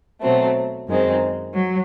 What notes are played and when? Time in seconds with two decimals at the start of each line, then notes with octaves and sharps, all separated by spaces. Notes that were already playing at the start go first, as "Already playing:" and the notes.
0.22 B2 F#3 A3 C4
0.88 F#2 D#3 G#3 C4
1.54 F#3